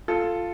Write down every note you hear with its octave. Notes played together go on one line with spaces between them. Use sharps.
F4 A4